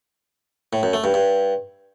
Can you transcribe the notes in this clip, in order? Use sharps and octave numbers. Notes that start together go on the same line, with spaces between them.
A2
F#2
A3
G2
G2